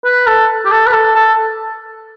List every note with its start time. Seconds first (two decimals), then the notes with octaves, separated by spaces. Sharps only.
0.05 B4
0.27 A4
0.66 G4
0.71 A4
0.87 B4
0.93 A4
1.15 A4